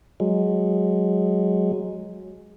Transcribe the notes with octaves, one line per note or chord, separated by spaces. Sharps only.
F#3 G#3